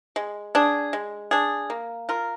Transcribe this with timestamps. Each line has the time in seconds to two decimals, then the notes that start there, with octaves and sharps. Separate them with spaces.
0.16 G#3
0.55 D4 G#4
0.93 G#3
1.31 D4 G#4
1.70 A#3
2.09 F4 A#4